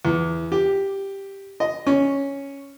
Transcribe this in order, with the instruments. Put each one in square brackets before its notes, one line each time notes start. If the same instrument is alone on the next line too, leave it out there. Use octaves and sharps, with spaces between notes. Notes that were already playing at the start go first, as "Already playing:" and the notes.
[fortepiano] E2
G4
D#5
C#4